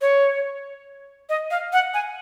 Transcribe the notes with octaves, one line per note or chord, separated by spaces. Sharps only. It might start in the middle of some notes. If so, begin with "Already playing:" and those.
C#5
D#5
F5
F#5
G#5